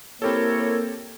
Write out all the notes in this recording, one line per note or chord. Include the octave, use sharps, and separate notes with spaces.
A#3 C4 E4 G4 A4 A#4 C#5